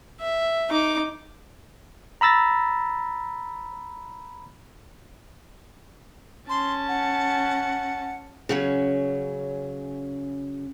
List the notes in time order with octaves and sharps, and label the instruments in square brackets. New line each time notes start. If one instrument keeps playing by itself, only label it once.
[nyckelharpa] E5
D#4 D6
[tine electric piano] A#5 B5 E6 A6 A#6
[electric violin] C#4 A5 [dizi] C6
[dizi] F#5
[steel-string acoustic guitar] C#3 F#3 C#4